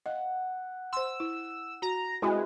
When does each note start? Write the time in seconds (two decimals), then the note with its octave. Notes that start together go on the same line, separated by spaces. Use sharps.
0.06 D#5 F#5
0.93 C5 C6 E6
1.20 E4
1.82 F#4 A#5
2.22 C3 G#3 E4 F#4 B4 G#5